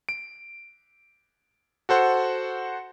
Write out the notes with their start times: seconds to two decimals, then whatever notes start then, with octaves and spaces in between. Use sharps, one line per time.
0.09 D7
1.89 F#4 A4 C5 F#5